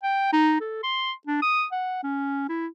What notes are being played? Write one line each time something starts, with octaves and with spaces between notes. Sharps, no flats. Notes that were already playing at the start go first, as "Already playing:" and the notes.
G5
D#4
A4
C6
D4
D#6
F#5
C#4
E4